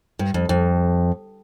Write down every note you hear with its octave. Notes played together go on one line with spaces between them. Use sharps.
G2
F2
F2